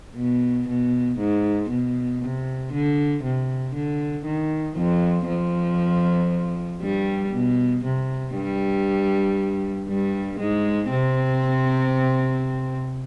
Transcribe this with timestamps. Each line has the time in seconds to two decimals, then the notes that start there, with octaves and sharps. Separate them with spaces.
0.16 B2
0.68 B2
1.19 G#2
1.70 B2
2.22 C3
2.73 D3
3.24 C3
3.75 D3
4.25 D#3
4.77 F2 F3
5.28 F2 F3
6.81 G2 G3
7.33 B2
7.85 C3
8.34 G2 G3
9.88 G2 G3
10.39 G#2 G#3
10.90 C3 C4